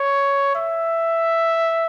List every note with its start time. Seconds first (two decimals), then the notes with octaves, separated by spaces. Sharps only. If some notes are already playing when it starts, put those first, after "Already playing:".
Already playing: C#5
0.55 E5